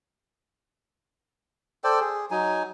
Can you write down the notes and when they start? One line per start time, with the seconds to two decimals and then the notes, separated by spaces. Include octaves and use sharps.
1.84 A4 C5 D5 G5
2.00 G#4
2.31 F#3 D#4 G#5